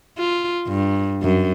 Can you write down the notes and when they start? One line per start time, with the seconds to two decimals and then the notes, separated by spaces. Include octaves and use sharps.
0.18 F4
0.68 G2
1.22 F#2